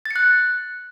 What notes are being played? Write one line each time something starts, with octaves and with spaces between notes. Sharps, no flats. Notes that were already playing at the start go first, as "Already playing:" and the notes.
A6
C#7
F#6